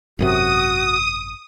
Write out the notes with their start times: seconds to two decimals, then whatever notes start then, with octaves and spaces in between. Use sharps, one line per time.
0.19 G#1 F#2 C3 F#4 D#6